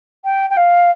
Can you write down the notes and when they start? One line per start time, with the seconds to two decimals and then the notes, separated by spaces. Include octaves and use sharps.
0.24 G5
0.50 G5
0.57 F5